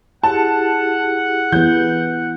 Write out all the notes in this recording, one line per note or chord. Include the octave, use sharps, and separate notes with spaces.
E4 G4 G#4 F#5 A5
E3 B3 G6